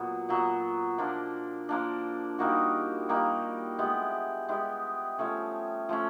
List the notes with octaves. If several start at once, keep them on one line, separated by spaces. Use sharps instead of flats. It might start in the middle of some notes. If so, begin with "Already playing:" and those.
Already playing: A#2 F#3 B3
A#2 F#3 B3
F3 A#3 D4
F3 A#3 D4
G3 A#3 D#4 F#4
G3 A#3 D#4 F#4
G#3 B3 E4 G4
G#3 B3 E4 G4
F3 A3 C#4
F3 A3 C#4